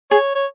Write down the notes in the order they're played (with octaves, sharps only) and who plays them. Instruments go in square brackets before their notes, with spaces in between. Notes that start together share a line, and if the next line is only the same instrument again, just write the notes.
[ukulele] G#4 [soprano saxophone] C#5
[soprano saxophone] C#5